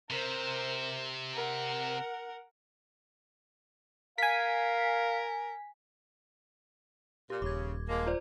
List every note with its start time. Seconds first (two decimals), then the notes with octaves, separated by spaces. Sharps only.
0.10 C3 A#4 C5
1.34 A#4 F#5
4.18 A#4 F5 G#5 B6
7.30 A#2 G4
7.42 D#1 C#3 D6 G#6
7.89 F3 G#3 A#3
8.07 F4 C5 D5